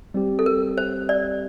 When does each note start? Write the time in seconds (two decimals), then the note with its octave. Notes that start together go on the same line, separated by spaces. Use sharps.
0.14 G3 C4 G4
0.39 A4
0.46 A#4
0.78 C5
1.09 D5